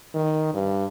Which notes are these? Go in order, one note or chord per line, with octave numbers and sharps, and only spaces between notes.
D#3
G2